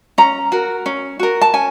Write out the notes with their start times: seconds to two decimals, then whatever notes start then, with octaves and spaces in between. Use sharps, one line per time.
0.18 C#4 A#5
0.52 F#4 A#4
0.86 C#4
1.19 F#4 A#4
1.41 A5
1.54 C#4 G#5